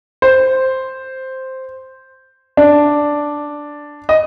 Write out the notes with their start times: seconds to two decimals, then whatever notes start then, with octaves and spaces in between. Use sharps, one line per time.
0.22 C5
2.57 D4 D5
4.09 D#5